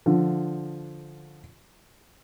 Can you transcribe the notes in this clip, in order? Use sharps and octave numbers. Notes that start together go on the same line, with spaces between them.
D3 F3